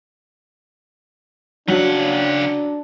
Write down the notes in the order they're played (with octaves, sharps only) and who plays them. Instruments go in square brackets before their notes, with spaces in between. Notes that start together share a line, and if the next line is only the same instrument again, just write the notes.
[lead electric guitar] C#3 F#5 [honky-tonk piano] F#3 [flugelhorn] D4